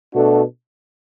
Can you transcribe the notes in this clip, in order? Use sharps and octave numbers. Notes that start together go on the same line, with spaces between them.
B2 A3 D4 F#4 A4